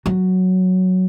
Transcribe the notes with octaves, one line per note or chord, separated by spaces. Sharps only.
F#3